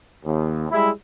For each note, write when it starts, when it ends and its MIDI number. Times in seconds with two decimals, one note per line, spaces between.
0.24 0.65 39
0.72 0.90 55
0.72 0.90 56
0.72 0.90 64